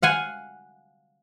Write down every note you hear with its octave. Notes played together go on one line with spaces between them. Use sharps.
F5 F#5 G#5